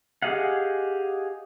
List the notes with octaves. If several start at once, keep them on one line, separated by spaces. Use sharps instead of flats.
G4 G#4 D#5 F5 F#5